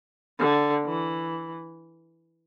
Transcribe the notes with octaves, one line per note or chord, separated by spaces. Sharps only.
D3
E3